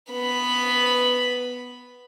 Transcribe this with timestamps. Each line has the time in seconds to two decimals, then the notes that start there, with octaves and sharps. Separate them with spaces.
0.10 B3 B5